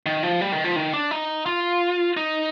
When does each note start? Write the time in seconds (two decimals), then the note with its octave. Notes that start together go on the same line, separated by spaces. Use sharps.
0.06 D#3
0.23 F3
0.41 G3
0.52 D#3
0.64 F3
0.76 D#3
0.94 D4
1.11 D#4
1.46 F4
2.17 D#4